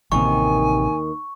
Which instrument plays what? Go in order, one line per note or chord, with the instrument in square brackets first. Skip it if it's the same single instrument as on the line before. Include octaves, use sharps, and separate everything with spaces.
[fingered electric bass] A1 C3 [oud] D#2 D#3 [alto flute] G#5 [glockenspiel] C#6